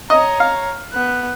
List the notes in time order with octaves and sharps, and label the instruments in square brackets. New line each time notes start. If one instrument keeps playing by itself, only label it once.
[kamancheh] C#5 A#5 [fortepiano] D#5
[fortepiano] F5
[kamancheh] B3 F#6